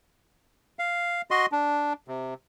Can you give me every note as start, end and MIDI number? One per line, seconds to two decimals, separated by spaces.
0.79 1.21 77
1.31 1.46 66
1.31 1.46 75
1.31 1.46 84
1.52 1.93 62
2.08 2.34 48